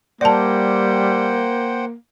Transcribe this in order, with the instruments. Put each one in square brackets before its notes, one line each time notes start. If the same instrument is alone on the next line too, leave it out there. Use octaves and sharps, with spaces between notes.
[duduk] G3 [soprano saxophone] A#3 [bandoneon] C5 F#5 G5 [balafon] D5 A5